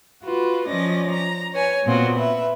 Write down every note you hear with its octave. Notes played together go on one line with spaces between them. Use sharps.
F4 F#4 B4
F3 C#4 D5 D#5 A#6
A#5
B4 C#5 G#5
A#2 B3 C4 F4 F#4
B4 E5